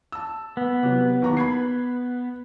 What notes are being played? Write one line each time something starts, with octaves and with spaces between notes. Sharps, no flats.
A5 E6
B3
C3 F#3
D#2 A#5 C#6
B5 G#6 C7